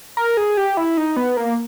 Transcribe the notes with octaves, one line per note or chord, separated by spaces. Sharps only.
A#4
G#4
G4
E4
D#4
B3
A#3